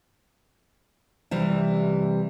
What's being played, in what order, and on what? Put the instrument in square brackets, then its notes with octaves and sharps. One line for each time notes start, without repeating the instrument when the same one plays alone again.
[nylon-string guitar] C3 E3 G3